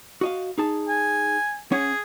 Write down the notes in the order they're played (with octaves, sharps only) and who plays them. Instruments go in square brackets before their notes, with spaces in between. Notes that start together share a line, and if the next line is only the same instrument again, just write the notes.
[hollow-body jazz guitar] F#4 D#5 F5
D#4 G#4 A5
[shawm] G#5
[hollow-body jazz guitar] C#4 C#5 F#5 [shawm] G#4